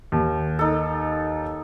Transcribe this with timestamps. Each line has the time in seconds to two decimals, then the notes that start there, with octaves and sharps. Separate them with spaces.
0.12 D#2
0.59 D#4 A4